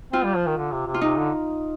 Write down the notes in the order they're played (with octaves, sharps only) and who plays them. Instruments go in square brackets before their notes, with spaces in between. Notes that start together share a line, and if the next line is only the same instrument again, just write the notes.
[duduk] C4 [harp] F4
[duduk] G3
F3
D#3
D3
C3
C3
[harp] F4
[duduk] C3 [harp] D#4
[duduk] D3